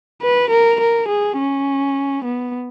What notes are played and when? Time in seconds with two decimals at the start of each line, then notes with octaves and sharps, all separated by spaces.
0.22 B4
0.51 A#4
0.81 A#4
1.09 G#4
1.39 C#4
2.25 B3